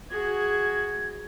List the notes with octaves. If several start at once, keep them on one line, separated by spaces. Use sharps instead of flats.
F#4 G#4 G#6